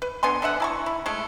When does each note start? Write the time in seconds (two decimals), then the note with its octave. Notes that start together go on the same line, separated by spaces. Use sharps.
0.02 B4
0.23 D3 B3 G#5 C6
0.42 D3 B3 E5 F#5
0.60 E4 A5 C#6
0.86 E4
1.06 G#3 A3